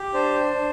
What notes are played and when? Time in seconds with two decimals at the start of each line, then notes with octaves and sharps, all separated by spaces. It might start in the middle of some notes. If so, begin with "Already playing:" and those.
Already playing: G4
0.14 D4 C5
0.54 D4